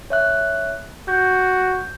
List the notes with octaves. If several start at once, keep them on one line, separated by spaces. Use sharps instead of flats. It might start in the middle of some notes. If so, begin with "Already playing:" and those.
C#5 E5 F#6
F#4 G6